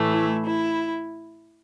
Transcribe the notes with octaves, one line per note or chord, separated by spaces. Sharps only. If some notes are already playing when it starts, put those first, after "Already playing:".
Already playing: A2 E3 A3
E4
E4